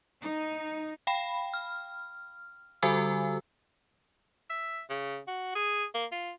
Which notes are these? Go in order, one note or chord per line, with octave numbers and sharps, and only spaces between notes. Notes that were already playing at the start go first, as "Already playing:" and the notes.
D#4
F5 G5 B5
F6
D3 G3 F#4 A4 G#5 E6
E5
C#3
F#4
G#4
A#3
F4